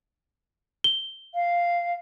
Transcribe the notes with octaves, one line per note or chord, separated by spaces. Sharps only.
G7
F5